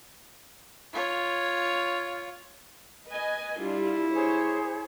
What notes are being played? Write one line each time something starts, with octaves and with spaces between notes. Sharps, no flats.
F4 C#5
B4 D#5 G#5
G3 D4 E4 F4
G#4 C5 C#5